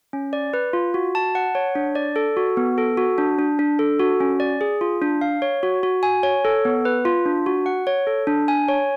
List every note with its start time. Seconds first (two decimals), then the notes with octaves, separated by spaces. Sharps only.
0.13 C#4
0.33 D5
0.54 B4
0.73 F4
0.94 F#4
1.15 A5
1.35 F#5
1.55 C#5
1.75 D4
1.95 D5
2.16 A4
2.37 F#4
2.57 B3
2.78 A4
2.97 F#4
3.18 D4
3.39 D4
3.59 D4
3.79 A4
3.99 F#4
4.20 C#4
4.40 D5
4.61 G#4
4.81 F4
5.02 D4
5.21 F5
5.42 C#5
5.63 F#4
5.83 F#4
6.03 G#5
6.23 C#5
6.45 A4
6.65 B3
6.85 B4
7.05 F4
7.26 D4
7.46 F#4
7.66 F#5
7.87 C#5
8.07 A4
8.27 D4
8.48 G#5
8.68 C#5